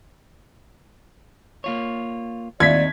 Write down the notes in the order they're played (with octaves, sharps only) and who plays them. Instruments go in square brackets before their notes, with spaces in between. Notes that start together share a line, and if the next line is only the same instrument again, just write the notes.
[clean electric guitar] A#3 F4 C#5
[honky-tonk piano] D#2 E5 [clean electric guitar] D#3 C4 D#4 [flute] D5 [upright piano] G#6 B6